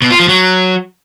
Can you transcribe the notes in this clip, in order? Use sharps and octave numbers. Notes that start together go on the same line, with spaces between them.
B2
F4
F3
F#3